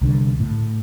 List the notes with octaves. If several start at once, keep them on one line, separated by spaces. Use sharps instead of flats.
C2 D3
A2